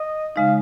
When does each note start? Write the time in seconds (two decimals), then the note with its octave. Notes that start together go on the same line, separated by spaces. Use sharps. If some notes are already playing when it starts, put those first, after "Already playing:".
Already playing: D#5
0.36 C#3 G#3 D#4 F5